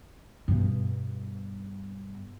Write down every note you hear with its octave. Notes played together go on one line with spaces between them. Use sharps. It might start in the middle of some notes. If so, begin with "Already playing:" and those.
G2 B2